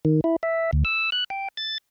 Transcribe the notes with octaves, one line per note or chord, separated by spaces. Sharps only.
D#3
E4
E5
D2
E6
F#6
G5
A6